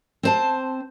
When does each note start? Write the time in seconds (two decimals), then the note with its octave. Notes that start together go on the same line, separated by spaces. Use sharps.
0.23 C4 C5 A5